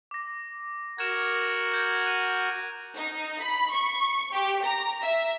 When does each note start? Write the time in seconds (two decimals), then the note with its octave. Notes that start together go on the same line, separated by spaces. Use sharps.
0.11 D6 A#6
0.98 F#4 A#4 G#6 E7
1.74 G6 G#6
2.06 F#6 D#7
2.96 D#4
3.40 B5
3.73 C#6
4.34 G4
4.65 A#5
5.03 E5